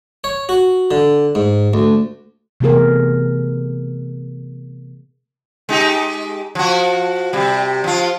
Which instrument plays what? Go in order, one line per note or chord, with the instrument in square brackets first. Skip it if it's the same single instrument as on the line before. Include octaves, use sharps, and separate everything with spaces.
[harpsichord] C#5
F#4
D3
G#2
D2
[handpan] C3 E3 A3 B3 G#4 A#4
[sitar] G#3 D#4 G4
F3 F#4
C3 G3
F3 F4